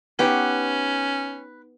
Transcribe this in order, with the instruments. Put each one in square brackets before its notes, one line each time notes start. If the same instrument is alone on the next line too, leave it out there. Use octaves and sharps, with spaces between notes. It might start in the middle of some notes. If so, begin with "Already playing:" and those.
[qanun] B3 D#4 G4 [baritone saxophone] C#4 [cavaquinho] B4 G5 C#6